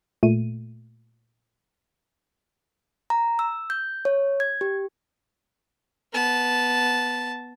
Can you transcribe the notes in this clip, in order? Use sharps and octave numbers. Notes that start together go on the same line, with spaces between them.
A#2 A3 D#7
A#5
E6
G6
C#5
G#6
G4
B3 A5